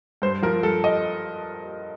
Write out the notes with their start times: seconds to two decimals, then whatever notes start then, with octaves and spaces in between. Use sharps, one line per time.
0.22 G2 C5
0.42 F3 A#4
0.63 G2 A4
0.84 D#5